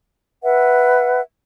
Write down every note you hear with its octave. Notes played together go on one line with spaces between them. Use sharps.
B4 E5 F#5